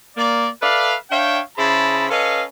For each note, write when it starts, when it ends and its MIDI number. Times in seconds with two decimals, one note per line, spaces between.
0.17 0.47 58
0.17 0.47 74
0.62 0.94 69
0.62 0.94 71
0.62 0.94 74
0.62 0.94 76
0.62 0.94 77
1.10 1.39 62
1.10 1.39 73
1.10 1.39 76
1.10 1.39 77
1.10 1.39 79
1.57 2.08 49
1.57 2.08 64
1.57 2.08 68
1.57 2.08 72
1.57 2.08 81
1.57 2.08 83
2.10 2.43 61
2.10 2.43 69
2.10 2.43 71
2.10 2.43 75
2.10 2.43 77